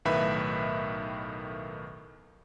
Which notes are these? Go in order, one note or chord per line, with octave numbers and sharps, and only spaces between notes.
B1 A2 D#3 B4 E5 B5